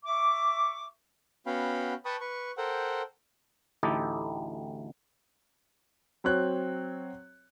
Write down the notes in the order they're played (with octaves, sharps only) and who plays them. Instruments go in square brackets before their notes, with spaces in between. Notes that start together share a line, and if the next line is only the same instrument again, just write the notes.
[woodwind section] E5 C#6 D6
[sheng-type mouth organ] B3 C#4 F#4 F5 G5 B5
B4 G5 A5 B5 C#6 D#6
B4 C#6
A4 A#4 C5 F#5 G5
[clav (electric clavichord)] A1 D2 D#4 E4 G4 A4
[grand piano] F#3 C4 C#5 F#6